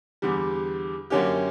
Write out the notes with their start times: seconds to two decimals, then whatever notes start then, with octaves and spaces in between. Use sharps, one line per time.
0.22 E2 D3 G3
1.10 F#2 D3 A#3 C#4 G4